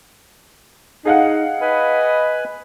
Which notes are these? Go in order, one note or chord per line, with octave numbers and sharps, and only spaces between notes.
D#4 G#4 F5 F#5
B4 D#5 G#5 B5